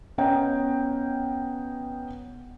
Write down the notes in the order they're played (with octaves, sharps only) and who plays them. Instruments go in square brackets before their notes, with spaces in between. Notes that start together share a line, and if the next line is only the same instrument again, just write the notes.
[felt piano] B3 C#4 D#5 F#5 G5 A#5